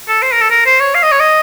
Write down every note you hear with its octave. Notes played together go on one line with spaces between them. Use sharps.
A4
C5
A#4
A4
A#4
C5
C#5
F5
D#5
C#5
D#5